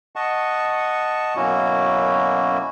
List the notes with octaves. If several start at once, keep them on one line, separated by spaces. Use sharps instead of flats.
D#5 F#5 A5 C#6
F#2 B2 A#3 C#4 E4 F#4